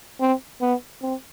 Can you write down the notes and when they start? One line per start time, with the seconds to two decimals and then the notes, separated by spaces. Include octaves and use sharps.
0.20 C4
0.61 B3
1.02 C4